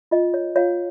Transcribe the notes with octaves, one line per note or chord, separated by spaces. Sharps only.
F4 D#5
C#5
F4 C#5 F5